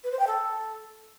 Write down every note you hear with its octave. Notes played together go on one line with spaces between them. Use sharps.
B4
C5
G5
A4